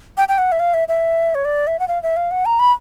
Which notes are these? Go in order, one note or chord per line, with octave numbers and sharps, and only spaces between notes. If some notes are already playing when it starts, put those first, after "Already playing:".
G5
G5
F#5
E5
F5
E5
E5
C#5
D5
E5
F#5
F5
E5
F5
F#5
A#5
B5